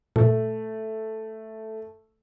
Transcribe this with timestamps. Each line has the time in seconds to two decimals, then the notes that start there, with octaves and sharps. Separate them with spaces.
0.16 A#2 A3